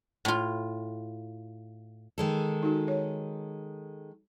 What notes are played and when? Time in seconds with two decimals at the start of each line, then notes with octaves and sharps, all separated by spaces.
0.25 A2 F4
2.18 D#3 G#3 A4
2.63 D#4 F#4
2.88 C#5